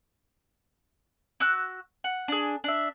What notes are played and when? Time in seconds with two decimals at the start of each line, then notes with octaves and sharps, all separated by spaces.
1.40 F#4 E6 F#6
2.04 F#5
2.28 D4 G#4
2.64 D4 E5